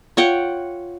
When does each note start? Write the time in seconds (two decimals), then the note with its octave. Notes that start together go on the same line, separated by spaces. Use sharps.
0.17 F4 C#5 F#5 G5